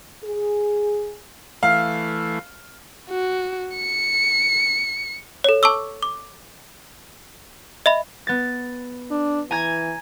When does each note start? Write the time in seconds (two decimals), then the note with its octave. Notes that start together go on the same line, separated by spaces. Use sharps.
0.24 G#4
1.63 E3 A3 F5
3.10 F#4
3.76 C#7
5.44 A4 C#5
5.63 A5 C#6 D6 E6
6.03 D6
7.86 D#5 E5 B5
8.27 B3 A6
9.11 D4
9.51 E3 G#5 A#5 G#6